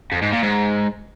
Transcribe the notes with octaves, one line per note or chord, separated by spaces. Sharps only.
F2
G#2
A#2
G#2